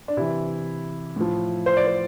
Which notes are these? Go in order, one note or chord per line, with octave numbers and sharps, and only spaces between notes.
D4
C3 E3 E4
A2 F3
C5
D5
C5